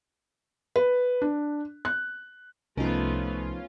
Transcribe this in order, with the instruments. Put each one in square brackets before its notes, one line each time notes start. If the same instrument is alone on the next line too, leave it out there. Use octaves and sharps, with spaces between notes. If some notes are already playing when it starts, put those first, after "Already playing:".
[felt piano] B4
D4
F#6
[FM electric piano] C2 [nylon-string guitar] F3 D#4 A#4 [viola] A3 B3 [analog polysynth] C#4 F4